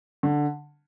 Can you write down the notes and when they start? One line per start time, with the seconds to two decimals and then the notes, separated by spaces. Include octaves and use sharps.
0.23 D3